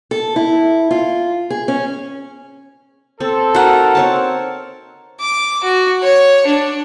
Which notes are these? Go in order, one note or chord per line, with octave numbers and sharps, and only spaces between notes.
A4
E4
F4
G#4
C#4
C4 A4
D#4 F#4 A#4 F#5
C4 C#5 A5
D6
F#4
C#5
D4